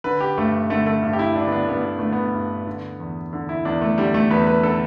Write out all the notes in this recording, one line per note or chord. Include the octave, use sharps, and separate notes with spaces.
D3 B4
G4
G2 A3
D3 A3
A3
G2
G4
E4
D3 D4
B3
D4
G2 B3
B3
D3 A3
B3
G2
D3
E2
D3
E4
E2 D4
A3
D3 G3
A3
E2 B4
B4
D3 A4